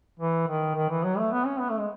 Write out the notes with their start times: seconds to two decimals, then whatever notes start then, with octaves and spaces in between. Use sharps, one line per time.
0.20 E3
0.48 D#3
0.75 D#3
0.90 E3
1.04 F#3
1.18 A3
1.32 B3
1.46 C#4
1.60 B3
1.70 A3
1.79 G#3